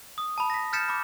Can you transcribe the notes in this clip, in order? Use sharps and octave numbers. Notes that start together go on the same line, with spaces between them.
D#6
A5 B5
A#6 B6
F6 G6 A6 B6 C#7 E7
B5 D6